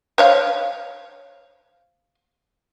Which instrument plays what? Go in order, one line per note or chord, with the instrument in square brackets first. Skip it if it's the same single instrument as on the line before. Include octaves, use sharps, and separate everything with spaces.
[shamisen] C5 C#5 F5